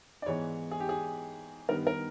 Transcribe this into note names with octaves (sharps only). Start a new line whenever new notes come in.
D5
G#2 E3 G#3 B3 C#5
G#4
G4
G#4
G2 D#3 G3 B3 A#4
A#4